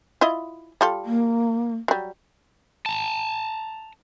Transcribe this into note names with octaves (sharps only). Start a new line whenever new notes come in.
E4 F4 D#5
G3 F4 A4
A#3
F#3 G3
A5 A#5